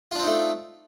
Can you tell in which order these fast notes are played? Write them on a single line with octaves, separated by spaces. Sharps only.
F4 D4 C4 D#4 A3